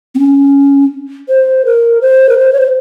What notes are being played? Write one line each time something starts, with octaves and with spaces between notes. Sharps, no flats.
C4
C#4
C5
A#4
C5
A#4
C5
C#5
C5